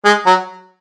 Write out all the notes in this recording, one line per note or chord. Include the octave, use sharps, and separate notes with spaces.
G#3
F#3